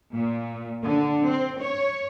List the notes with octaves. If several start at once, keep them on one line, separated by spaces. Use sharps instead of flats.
A#2
D3
C4
C#5